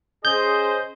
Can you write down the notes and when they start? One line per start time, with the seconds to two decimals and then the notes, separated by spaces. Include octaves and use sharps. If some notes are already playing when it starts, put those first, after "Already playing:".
0.25 C#4 G#4 C5 D#5 G6